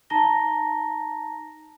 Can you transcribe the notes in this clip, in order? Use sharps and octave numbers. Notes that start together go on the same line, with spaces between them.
D#4 A5 A#5 A#6 G7